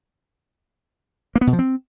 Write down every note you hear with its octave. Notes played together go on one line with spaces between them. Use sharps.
A#3
B3
B2
F3
C4